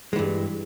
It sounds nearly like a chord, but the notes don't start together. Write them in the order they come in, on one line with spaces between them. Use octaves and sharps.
G#3 E3 G2